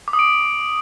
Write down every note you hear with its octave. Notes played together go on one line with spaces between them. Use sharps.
D6
D#6
D7